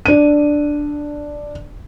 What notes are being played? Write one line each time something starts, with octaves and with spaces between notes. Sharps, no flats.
D4 D#7